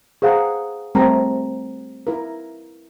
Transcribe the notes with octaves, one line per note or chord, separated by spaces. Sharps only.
G#4 C5 F5 F#5 A#5
G3 A3 C4 G4 A#4 A#5
E4 A#4